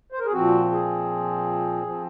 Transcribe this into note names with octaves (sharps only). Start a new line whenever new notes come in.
C5
A#4
G#4
A#2 F3 C4 F#4
G#4
F3 C4